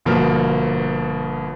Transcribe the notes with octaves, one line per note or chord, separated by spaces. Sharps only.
G1 B2 F3 A#3 A#5 F6